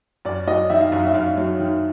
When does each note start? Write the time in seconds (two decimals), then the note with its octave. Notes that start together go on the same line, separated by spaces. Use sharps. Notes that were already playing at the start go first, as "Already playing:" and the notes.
0.25 F#2 D5
0.47 F#3 D#5
0.70 D#3 E5
0.81 F5
0.92 F#2 F5
1.03 E5
1.14 F#2 F5
1.37 F#3
1.60 D#3